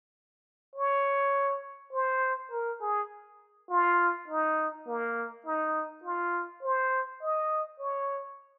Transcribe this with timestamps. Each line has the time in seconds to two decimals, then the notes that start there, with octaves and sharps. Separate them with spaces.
0.76 C#5
1.93 C5
2.51 A#4
2.81 G#4
3.70 F4
4.28 D#4
4.87 A#3
5.46 D#4
6.04 F4
6.62 C5
7.22 D#5
7.79 C#5